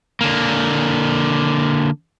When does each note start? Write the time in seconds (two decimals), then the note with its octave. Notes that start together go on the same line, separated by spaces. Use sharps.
0.21 D3 A#3